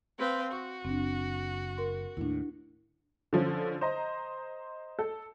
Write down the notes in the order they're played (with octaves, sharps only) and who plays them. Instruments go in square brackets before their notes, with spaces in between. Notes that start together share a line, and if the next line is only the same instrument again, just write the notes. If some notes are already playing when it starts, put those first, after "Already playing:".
[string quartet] C4 B4 F5
[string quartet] F#4 [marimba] C6 C#6
[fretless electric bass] F#1 [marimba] C4 D4
[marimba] A#4 C6
[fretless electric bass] D#2 A2 [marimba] D4 E4
[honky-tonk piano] D3 F3 C#4
C5 D#5 A#5
A4